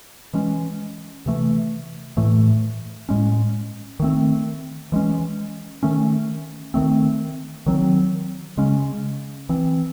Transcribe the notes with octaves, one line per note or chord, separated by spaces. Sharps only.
E3 G#3 C#4
C3 E3 A3
A2 E3 A3
A2 G#3 C#4
D#3 A3 C4
E3 G#3 C#4
D#3 A3 C#4
D#3 A3 C4
D#3 F#3 C4
C#3 G#3 C#4
E3 C4